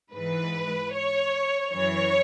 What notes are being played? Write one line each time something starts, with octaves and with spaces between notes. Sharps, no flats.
G#2 E3 B4
C#5
F#2 E3 C#5